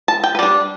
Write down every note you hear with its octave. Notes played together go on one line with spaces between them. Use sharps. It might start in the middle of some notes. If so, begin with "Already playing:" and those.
A5
G5
B4
G3 D4 D5